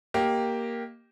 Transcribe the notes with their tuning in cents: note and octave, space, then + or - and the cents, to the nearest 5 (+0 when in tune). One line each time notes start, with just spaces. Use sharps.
A#3 +5 G4 +0 D#5 +0